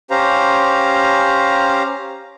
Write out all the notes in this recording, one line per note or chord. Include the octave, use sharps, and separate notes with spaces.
C#4 G4 C5 F5 A#5